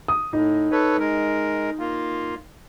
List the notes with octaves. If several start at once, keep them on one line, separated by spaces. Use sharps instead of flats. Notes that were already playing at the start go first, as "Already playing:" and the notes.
D#6
A2 D#4
A4 B4 C#5
G#3 A#4
A#3 F4